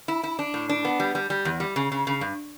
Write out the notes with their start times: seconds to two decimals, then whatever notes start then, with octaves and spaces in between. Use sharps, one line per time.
0.08 E4
0.23 E4
0.39 D4
0.54 A2
0.69 D4
0.85 B3
1.00 G3
1.15 G3
1.30 G3
1.45 E2
1.60 G3
1.76 C#3
1.92 C#3
2.07 C#3
2.21 G2